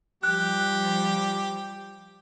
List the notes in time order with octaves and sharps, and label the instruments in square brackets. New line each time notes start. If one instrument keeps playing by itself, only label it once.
[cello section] F3 G3 [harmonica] G4 [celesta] F#6